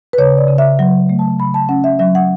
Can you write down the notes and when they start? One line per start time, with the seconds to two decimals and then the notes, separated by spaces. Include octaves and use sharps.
0.13 B4
0.18 C#3 C#5
0.38 D5
0.48 C#3
0.58 E5
0.79 F#3 F#5
1.10 A3
1.19 A5
1.39 C#3 B5
1.54 A5
1.69 C#4 F#5
1.84 E5
1.99 F#3 E5
2.15 F#5